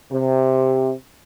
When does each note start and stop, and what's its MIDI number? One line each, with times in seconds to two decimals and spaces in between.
0.12 0.94 48